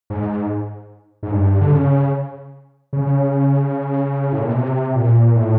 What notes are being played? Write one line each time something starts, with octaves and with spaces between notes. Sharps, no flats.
G#2
G#2
G2
D3
C#3
C#3
A2
A#2
B2
C3
A#2
A2